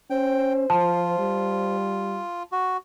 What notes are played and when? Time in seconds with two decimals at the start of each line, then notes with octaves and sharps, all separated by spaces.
0.10 C#4 C5 G5
0.70 F3 F4 A5
1.19 G3
2.52 F#4